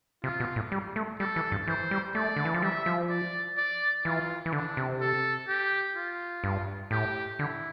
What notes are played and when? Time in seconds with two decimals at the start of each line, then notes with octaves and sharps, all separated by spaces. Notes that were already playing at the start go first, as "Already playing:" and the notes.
0.24 C3 F4
0.40 B2
0.56 A2
0.72 G3
0.96 A3
1.19 G3 A4
1.36 E3
1.52 G2
1.68 E3 C5
1.91 G3
2.15 A3 D5
2.36 D3
2.45 E3
2.54 F3
2.62 G3 E5
2.86 F3
3.10 D5
3.57 D5
4.05 E3 F4
4.46 E3
4.53 D3 D4
4.77 C3
5.01 A4
5.48 G4
5.96 F4
6.44 G2
6.91 A2 G4
7.38 D3 E4